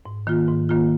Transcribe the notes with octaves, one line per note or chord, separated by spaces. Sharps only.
G#2
D#3 A#3 F4
G#2
D#3 A#3 F4